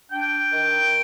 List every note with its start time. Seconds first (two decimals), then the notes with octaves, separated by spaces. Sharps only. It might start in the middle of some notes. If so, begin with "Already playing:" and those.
0.11 D4 G5
0.53 D#3